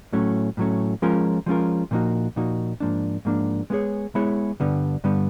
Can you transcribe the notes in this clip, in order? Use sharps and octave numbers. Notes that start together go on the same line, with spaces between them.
A2 F#3 A3 C#4
A2 F#3 A3 C#4
F3 G#3 C#4 F4 A#4
F3 G#3 C#4 F4 A#4
A#2 F3 A#3 D#4 F#4
A#2 F3 A#3 D#4 F#4
G#2 F3 A#3 D4
G#2 F3 A#3 D4
G#3 B3 E4 G#4 C#5
G#3 B3 E4 G#4 C#5
G2 D3 G3 B3
G2 D3 G3 B3